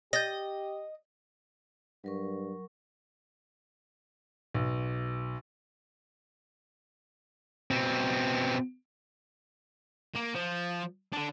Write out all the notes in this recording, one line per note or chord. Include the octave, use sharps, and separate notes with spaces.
G4 D#5 G6 A6 A#6
G2 F#3 A#4 C#6
B1
B2 C4
A#3
F3
D3 D4